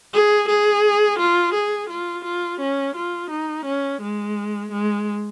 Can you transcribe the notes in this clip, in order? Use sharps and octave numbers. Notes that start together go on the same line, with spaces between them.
G#4
G#4
F4
G#4
F4
F4
C#4
F4
D#4
C#4
G#3
G#3